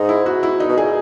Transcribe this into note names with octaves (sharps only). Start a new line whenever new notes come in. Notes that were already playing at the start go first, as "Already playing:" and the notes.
Already playing: G#2 D#4
E4
F#4
E4
A#2 D#4
B2
A#2 G#4